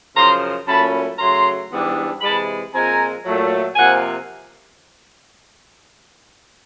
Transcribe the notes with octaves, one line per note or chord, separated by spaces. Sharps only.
F#2 C#3 F3 A#5 C6
A#2 F#3 A3 C#4 A5 B5
C#3 F#3 A3 A#5 C6
G#2 E3 G3 B3 D4
C3 E3 G#3 A5 B5
A#2 F3 G#3 C4 G#5 A#5
A#2 F#3 A3
C3 F3 A#3 F#5 G#5